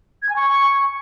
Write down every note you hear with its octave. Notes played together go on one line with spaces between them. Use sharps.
G#6
G#5
C#6